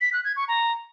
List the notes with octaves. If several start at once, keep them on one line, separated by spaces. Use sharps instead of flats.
B6
F#6
G#6
C#6
A#5